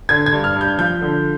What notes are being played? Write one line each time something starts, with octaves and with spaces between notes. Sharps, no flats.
D3 G#6
G#6
G2
F6
G2
G6
F3 G6
D3